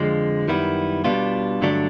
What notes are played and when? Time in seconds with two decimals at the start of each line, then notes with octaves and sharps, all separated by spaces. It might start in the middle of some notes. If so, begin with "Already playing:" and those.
Already playing: F2 D3 F3 G#3
0.48 F#2 D#3 G3 B3 E4
1.04 B2 G3 B3 D4 F4
1.61 G2 D3 F#3 A3 D4